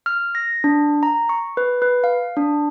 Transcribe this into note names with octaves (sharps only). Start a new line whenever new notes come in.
F6
A#6
D4
A#5
C#6
B4
B4
F5
D4